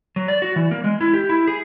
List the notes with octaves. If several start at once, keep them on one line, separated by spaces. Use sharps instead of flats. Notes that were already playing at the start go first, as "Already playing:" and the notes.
F#3
D5
F#4
E3
A#3
G#3
E4
G4
E4
G#4